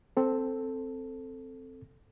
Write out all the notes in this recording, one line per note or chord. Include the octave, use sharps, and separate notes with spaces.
C4 A4